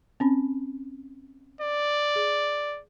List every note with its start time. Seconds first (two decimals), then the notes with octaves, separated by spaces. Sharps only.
0.20 C4 C#4 B5
1.61 D5
2.16 G#4